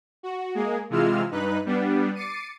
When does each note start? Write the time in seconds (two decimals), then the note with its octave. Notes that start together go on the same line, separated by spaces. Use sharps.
0.23 F#4
0.55 G#3 A#3 G#4
0.90 C3 E3 G#3 F4 E6 F6
1.31 G2 D#4 B4 F#6
1.65 G3 B3 D4
2.14 D6 A6 C7 C#7 D#7